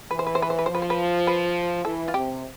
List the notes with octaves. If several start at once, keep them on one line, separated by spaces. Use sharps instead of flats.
E3 B4
C5
B4
C5
B4
C5
B4
F3 C5
B4
C5
B4
B4
E3 A4
F4
C3 G4